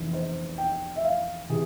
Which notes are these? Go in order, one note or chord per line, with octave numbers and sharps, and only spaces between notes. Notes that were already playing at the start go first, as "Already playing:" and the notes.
Already playing: F1 E2 E3
C5
G5
E5
F5
C3 E3 G#4